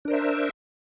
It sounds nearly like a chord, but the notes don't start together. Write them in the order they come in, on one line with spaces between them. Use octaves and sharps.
D4 A#4 C5 E5